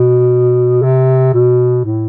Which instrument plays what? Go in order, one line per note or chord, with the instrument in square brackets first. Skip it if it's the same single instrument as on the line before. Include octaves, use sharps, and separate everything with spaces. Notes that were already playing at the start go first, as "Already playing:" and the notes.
Already playing: [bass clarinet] B2
C3
B2
A2